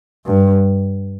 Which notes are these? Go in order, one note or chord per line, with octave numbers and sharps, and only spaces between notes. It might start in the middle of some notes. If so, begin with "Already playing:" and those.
G2